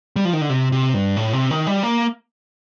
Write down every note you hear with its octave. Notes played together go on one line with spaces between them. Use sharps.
G3
F3
D#3
D3
C3
C3
G2
A2
C3
D#3
G3
A#3